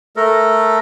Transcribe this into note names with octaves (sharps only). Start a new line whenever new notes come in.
A3 A4 A#4